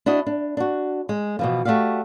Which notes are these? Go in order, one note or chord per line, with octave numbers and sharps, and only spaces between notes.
D4 E4 F#4 D#5
D4
D4 F#4
G#3
B2 E3 F3
A3 F#4 G4 D5 F5